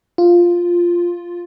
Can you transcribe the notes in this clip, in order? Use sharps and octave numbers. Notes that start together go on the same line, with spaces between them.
F4